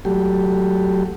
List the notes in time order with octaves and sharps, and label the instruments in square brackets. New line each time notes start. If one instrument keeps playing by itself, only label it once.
[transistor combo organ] F#3 A3 G4